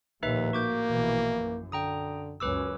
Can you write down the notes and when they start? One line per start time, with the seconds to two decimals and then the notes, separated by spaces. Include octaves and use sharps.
0.23 A#1 D#2 A2 D#4 B4 E5
0.53 A#3 F#4 D6 G6
0.87 A#1 B2 E3
1.36 F#2
1.72 D3 G5 A#5 D#6
2.40 C#2 F#2 C#4 B4 D6 E6